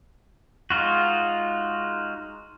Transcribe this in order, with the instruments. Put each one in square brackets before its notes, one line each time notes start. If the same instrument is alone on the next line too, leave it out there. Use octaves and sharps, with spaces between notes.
[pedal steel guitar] G#3 D#4 F4 F#4